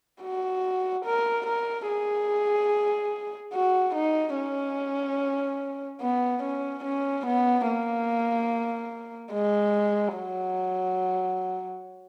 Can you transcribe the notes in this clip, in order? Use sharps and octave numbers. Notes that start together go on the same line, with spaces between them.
F#4
A#4
A#4
G#4
F#4
D#4
C#4
B3
C#4
C#4
B3
A#3
G#3
F#3